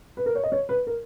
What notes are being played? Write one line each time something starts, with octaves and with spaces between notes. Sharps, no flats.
B4
A#4
C#5
D#5
C#5
B4
A#4